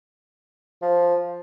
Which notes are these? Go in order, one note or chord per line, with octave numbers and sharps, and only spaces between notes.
F3